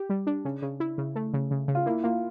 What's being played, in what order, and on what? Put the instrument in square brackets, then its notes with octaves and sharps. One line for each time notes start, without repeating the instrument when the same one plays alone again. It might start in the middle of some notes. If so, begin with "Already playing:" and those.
Already playing: [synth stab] G4
G3
D4
C#3
C#3
E4
C#3
A3
C#3
C#3
C#3
[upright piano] F4
[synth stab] A#3 [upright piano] E4
[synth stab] A#3 [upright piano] F4